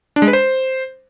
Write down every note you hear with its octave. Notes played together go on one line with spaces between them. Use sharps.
D4
G#3
B4
C5